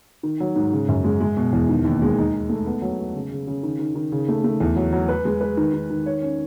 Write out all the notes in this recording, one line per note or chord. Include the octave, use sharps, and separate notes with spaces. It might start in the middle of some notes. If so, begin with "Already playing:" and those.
D#3
F#3
G#2
C#3
F#2
G#3
G#3
B2
E2
D#3
D#2
G#3
D#4
D#4
A3
B3
F#3
B3
C#3
C#3
C#3
D#3
D#3
D#3
C#3
A3
A3
E2
F#3
F#3
B4
G#3
B4
D#3
D#3
D#3
C#5
C#4